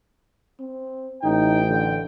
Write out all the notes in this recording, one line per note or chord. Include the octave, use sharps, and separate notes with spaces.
C4
A1 D#4 G5
D3